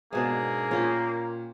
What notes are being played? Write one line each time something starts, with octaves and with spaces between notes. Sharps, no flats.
G#2 B2 A#3 D4 G#4
A#2 C#4 F4 G4